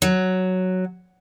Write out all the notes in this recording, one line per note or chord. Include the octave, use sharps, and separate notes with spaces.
F#3